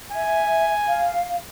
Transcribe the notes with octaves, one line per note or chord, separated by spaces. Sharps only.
E5 G#5
F5